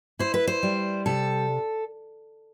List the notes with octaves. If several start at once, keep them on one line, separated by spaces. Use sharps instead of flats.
E4 C5
B4
C5
G3
C3 A4